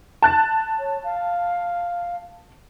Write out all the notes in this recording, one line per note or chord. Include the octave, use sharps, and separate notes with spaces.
A5 F#6 A6
C#5
F5